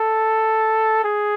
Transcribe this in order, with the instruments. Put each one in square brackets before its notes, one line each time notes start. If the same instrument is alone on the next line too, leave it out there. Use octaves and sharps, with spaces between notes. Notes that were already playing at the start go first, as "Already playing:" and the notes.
Already playing: [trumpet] A4
G#4